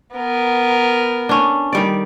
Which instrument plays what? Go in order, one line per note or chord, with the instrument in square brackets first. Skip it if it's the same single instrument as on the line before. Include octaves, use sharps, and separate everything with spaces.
[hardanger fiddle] B3 A#4
[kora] C#4 D4
D#3 G3 D5